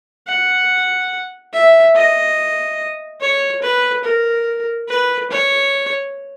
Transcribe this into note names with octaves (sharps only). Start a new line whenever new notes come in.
F#5
E5
D#5
C#5
B4
A#4
B4
C#5